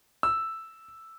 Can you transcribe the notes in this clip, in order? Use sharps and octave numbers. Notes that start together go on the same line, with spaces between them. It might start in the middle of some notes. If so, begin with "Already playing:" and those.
E6